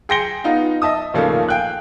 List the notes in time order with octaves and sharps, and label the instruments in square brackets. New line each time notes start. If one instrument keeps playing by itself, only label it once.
[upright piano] G#4 G5 C6 A#6 C#7 G7
B3 D#4 F4
D#5 E5 A5 D#6
D#2 A#2 C#3 F3 A3 A#3
F5 G5 G#5 F#6